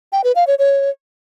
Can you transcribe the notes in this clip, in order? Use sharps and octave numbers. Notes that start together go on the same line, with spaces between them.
G5
B4
F5
C#5
C#5